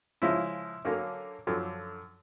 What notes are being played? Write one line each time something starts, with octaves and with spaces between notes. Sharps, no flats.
C#3 F3 G#3 C#4 E4
D3 F#3 A#3 C#4
F#2 D3 F3